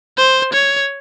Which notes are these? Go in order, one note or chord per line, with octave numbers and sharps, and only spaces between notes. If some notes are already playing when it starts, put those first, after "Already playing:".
C5
C#5